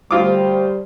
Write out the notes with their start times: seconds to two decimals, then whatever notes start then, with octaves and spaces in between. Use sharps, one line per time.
0.11 D2 G3 F4 C5 D6